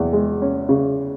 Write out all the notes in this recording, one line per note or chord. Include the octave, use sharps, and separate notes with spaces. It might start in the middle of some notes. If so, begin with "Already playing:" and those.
Already playing: E2
G#3
C#4
C#3